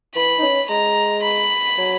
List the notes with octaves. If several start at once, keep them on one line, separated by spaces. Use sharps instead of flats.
E3 B5
D#4
C#4
G#3 A#5
B5
F#3